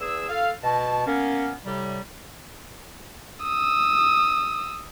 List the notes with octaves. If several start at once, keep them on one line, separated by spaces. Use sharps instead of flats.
E2 G#4 E6
F4 A4 F5
B2 A5
A#3 B3 C#4
A2 C3 G3
D#6 E6